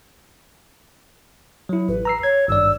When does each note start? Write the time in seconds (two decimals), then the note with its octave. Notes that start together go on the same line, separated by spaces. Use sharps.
1.69 F#3 E4
1.89 A1 B4
2.05 A#5 E6 C7
2.23 C#5 G#6
2.48 G#1 G2 D5 E6